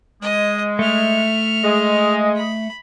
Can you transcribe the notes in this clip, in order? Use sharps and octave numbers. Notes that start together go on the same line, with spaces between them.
G#3 D#5
A3 E5 F6
G#3 D#5
B5